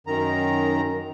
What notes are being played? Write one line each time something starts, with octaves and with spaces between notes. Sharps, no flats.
F#2 D#3 A#5